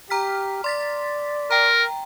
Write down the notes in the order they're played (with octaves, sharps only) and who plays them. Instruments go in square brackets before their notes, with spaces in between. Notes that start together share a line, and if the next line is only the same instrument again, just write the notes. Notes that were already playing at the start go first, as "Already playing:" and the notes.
[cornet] G4 [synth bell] A#5 F6 B6
[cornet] D5 [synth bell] C6 A6 B6
[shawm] A#4 [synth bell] G5 A#5